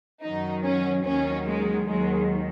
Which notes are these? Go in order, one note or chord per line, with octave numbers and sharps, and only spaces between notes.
F#2 D#3 F#3 D#4
C#4
D#2 D#3 F#3 C#4
G#3
D#2 D#3 F#3 G#3